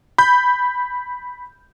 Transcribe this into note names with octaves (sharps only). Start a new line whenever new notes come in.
B5 G6